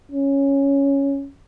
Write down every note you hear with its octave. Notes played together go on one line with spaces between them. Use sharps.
C#4